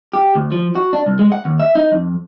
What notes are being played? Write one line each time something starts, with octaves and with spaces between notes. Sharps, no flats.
G4
D2
F3
F#4
D4
C2
G#3
F#5
D#2
E5
D#4
F2